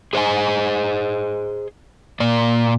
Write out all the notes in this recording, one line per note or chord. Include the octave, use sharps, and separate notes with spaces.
G#4 C5 D#5 G#5
A#2 A#3 D5